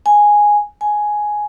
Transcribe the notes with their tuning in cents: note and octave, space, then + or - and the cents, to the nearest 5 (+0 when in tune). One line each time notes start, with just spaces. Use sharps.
G#5 +0
G#5 +10